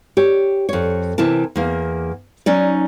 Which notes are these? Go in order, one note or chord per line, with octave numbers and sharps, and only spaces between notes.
G4 C#5
F2 C#5
C3 E3 E4 A#4 A5
E2 A#3
F#3 C#4 D#4 D5